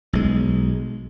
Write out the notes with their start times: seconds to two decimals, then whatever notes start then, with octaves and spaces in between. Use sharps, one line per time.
0.13 B1 G#3